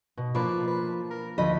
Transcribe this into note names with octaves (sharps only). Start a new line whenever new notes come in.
B2
F3 A#3 D4 B4 D6
B4
A#4
D2 F3 D#5 B5